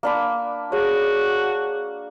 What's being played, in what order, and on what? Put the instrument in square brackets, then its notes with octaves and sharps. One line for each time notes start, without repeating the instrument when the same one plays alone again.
[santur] A#3 D4 B5
[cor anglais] F#4 [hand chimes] G#4 C#5